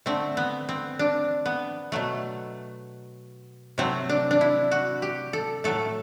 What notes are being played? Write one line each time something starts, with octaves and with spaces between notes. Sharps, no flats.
D3 A3 C4
B3
C4
D4
B3
B2 F#3 A3
C3 F#3 A3 C4
D4
D4
E4
F#4
G4
A4
A2 F#3 A3 A4